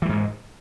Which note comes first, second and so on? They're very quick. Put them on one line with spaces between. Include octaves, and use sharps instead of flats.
E3 G3 G#2 G#3